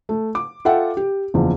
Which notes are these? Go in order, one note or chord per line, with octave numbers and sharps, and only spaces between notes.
A3
D6
F4 A4 E5 F#5 G5
G4
F#1 E2 F3